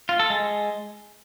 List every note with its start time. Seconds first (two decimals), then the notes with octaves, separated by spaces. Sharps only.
0.09 F4
0.20 A4
0.30 G#3